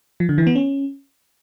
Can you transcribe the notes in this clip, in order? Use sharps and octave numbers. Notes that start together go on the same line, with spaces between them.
F3
D3
E3
B3
C#4